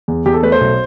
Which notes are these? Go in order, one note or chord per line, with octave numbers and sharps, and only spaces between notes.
E2
E2 G4
A4
A3 B4
C5
B1